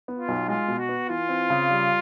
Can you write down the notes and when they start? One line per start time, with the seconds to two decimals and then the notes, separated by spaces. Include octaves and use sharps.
0.08 B3
0.18 F4
0.28 B1
0.48 G#3 F4
0.68 B2
0.78 F#4
0.89 B3
1.09 E3 F4
1.29 C4
1.50 C#3
1.70 G3